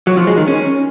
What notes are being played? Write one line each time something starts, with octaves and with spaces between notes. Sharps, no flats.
F#3
F3
G#3
D#3
C#4